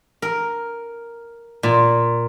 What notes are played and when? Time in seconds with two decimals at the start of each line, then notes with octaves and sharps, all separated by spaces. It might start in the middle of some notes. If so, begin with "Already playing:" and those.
0.22 A#4
1.63 A#2